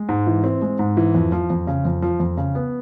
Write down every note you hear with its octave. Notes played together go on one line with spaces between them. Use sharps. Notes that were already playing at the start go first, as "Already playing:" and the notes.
Already playing: G#3
G#2
E3
C4
G#3
G#2
E3
F2
F3
F2
C#3
F2
F3
F2
C#3
B3